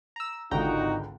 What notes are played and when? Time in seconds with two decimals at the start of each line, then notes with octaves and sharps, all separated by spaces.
0.16 A#5 E6
0.51 G#1 C#2 D3 D#4 F4 F#4 G5 A#5